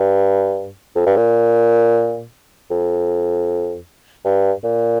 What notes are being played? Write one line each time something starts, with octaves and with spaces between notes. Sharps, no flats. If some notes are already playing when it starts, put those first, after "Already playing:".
Already playing: G2
F2
G2
A#2
F2
G2
A#2